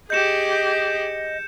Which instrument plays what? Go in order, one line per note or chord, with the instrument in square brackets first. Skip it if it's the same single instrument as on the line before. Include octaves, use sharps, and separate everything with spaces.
[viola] G4 G#4 [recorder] D#5 [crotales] G6 C#7 E7